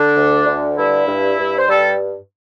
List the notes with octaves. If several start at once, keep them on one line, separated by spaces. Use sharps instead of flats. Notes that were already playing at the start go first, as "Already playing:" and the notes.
Already playing: D3 D4
D2
D3
G2 E4
G2
G2
C5
G3 A4